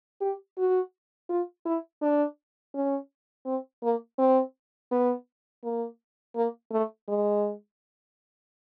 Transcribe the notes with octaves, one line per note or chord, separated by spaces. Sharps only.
G4
F#4
F4
E4
D4
C#4
C4
A#3
C4
B3
A#3
A#3
A3
G#3